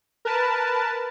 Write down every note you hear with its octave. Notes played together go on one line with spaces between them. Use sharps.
A#4 B4 A5